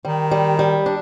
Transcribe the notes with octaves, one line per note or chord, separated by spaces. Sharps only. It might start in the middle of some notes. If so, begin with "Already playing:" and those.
D#3 G3
G3
G3
D4